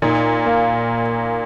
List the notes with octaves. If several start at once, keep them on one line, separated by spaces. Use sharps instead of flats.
A#2 D#4
A#3